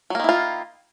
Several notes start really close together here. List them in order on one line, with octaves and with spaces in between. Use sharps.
F#3 A#3 D#3 E4 F4